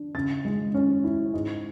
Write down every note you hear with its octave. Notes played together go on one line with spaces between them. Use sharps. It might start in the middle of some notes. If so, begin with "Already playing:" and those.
Already playing: D4
C#3 A6
G#3
C#4
E4
G#2